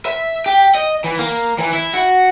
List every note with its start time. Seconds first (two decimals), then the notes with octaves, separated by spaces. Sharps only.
0.06 E5
0.46 G4
0.75 D#5
1.04 E3
1.19 A#3
1.58 E3
1.73 E4
1.93 F#4